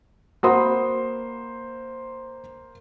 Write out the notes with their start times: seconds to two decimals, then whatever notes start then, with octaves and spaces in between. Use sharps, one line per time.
0.43 A#3 F#4 C5 B5 C6 D#6